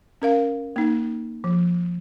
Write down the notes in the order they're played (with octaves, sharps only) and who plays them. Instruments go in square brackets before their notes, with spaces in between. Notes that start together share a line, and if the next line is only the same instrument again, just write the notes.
[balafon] C#4 A#4 F5
A#3 D#4
F3